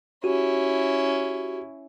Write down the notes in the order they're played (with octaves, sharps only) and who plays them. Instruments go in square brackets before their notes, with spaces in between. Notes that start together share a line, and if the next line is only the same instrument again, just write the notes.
[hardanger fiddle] C#4 E4 [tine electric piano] F#4 G4